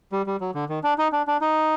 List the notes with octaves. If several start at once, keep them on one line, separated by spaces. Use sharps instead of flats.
G3
G3
F#3
D3
D#3
D4
D#4
D4
D4
D#4